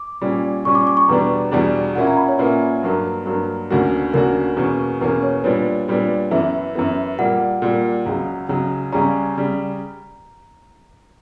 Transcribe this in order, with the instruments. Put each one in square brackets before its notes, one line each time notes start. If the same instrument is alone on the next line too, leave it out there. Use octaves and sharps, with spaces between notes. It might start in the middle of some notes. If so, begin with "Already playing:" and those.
Already playing: [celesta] D6
[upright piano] A#2 G3 C#4
[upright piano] A#2 G3 C#4 [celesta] C#6
[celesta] D6
D6
C#6
[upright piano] E2 B2 G3 B3 D4 [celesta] A#5
[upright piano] E2 B2 G3 B3 D4
[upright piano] A#2 A#3 C#4 E4 [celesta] F#5
[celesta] A#5
B5
C#5
[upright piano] A#2 A#3 C#4 E4 [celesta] B4
[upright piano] G2 F#3 A#3
G2 F#3 A#3
D2 D3 A#3 C#4 F#4
[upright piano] D2 D3 A#3 C#4 F#4 [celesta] A#4
[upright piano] E2 B2 A#3 C#4
[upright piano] E2 B2 A#3 C#4 [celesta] B4
[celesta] C#5
[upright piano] A#2 G3 B3 D4 [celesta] C#5
[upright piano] A#2 G3 B3 D4
[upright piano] F#2 E3 B3 [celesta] E5
[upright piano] F#2 E3 B3
[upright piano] A#2 G3 A#3 [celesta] F#5
[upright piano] A#2 G3 A#3
C#2 C#3 F#3
C#2 C#3 F#3
[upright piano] C#2 C#3 G3 C#4 [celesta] A#5
[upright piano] C#3 G3